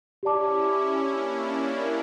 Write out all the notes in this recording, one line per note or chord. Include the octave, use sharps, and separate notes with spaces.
C#4 E4 G4 D5 A5 D6
A#3 D4